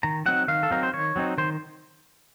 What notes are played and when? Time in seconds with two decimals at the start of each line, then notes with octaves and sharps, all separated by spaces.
0.03 D#3 A#5
0.26 F#3 C4 D#4 F#5
0.48 D#3 F5
0.63 A4
0.70 F#3 C4 D#4 A#4
0.83 C5
0.93 D#3 C#5
1.16 F#3 C4 D#4
1.38 D#3 C5